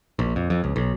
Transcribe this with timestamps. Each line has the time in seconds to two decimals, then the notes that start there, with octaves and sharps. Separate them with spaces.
0.19 A#1
0.36 F2
0.50 F2
0.64 C#2
0.76 B1